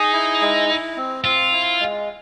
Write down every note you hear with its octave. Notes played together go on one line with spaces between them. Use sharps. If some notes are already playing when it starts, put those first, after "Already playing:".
Already playing: D#4 G#4
E4
G#3
E4
C4
C4 F4
E4
G#3